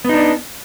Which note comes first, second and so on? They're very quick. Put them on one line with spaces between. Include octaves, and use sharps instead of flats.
B3 D#4 D4